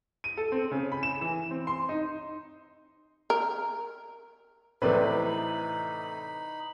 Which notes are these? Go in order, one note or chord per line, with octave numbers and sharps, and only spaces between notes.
D#7
A4
C4
C#3
B5
E7
E3
C4
C6
D#4
A#4
A2 C3 E3 D#4 B4 C5 D5 B5